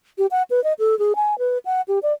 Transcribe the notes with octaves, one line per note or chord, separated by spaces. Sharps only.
G4
F#5
B4
D#5
A4
G#4
G#5
B4
F#5
G4
D5